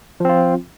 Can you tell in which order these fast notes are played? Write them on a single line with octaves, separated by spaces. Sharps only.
F3 C4 F4